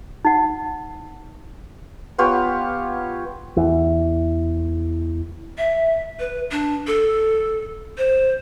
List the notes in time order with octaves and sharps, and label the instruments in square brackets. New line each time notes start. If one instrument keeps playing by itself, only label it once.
[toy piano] D#4 F#5
[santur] B3 F4 G4 C#5
[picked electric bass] E2 E3
[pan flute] E5
B4
D4
A4
C5